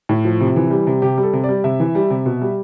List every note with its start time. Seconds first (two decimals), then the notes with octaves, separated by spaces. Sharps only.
0.09 A2
0.25 F3
0.41 C3
0.56 E3
0.71 G3
0.87 C3
1.02 C3 G4
1.18 G3
1.23 A4
1.33 C3
1.44 D5
1.49 G3
1.64 C3 E5
1.80 E3
1.95 G3
2.10 C3
2.26 B2
2.41 G3